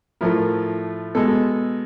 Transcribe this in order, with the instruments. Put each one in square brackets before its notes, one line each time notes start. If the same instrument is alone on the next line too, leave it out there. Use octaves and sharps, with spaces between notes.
[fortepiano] A2 F3 A3 A#4
B2 G#3 A4